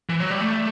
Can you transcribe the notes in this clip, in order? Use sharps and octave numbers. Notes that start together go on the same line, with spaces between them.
E3
F#3
G3
A3